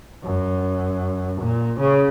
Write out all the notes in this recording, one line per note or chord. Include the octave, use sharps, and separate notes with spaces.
F#2
A#2
C#3